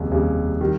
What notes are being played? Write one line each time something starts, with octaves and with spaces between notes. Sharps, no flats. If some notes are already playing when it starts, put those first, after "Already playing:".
Already playing: F1 D#2 C#3 G3
F1 D#2 C#3 G3
D#3 G3